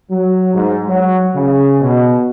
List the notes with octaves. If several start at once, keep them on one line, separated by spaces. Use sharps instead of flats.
F#3
G#2
F#3
C#3
B2